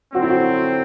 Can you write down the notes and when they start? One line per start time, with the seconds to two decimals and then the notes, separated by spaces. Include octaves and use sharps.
0.13 D3 F#3 C4 F#4
0.22 E4
0.30 F#4